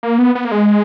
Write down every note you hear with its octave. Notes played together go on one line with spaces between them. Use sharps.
A#3
B3
B3
A#3
G#3